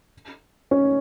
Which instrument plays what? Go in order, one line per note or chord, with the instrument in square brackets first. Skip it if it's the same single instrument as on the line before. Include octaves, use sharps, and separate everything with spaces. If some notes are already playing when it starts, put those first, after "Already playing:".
[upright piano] C#4